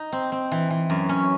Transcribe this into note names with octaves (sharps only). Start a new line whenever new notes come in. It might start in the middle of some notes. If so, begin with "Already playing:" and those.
Already playing: D#4
C4
C4
E3
E3
F#2
C#4